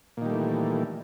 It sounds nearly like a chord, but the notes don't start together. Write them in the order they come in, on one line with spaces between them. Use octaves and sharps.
A#2 D#3 G3 A3 E3